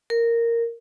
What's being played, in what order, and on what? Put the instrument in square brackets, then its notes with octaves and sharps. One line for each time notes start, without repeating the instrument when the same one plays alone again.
[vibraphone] A#4